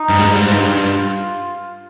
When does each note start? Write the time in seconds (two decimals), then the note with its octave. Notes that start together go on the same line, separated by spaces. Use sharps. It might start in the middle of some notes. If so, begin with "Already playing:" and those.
Already playing: D#4
0.09 G2
0.19 G#2
0.26 G2 F4
0.35 G#2
0.44 G2
0.51 G#2
0.60 G2